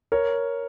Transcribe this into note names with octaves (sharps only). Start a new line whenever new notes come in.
A#4 C#5